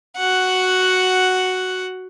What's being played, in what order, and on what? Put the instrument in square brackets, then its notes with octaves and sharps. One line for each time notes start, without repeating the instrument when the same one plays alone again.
[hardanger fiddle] F#4 F#5